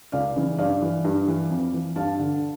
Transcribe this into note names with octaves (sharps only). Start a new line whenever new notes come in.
C#2 D5 F5
C#3 E3
G2 D5 F5
E3
G2
E3
F2
E3
G2 F5 A5
D3